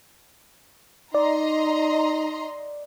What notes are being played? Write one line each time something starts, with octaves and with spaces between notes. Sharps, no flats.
D#4 D5 D#5 A#5 C6